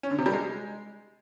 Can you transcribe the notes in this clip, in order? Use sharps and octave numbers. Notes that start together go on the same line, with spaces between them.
C#4
D3
C3
G3
G#3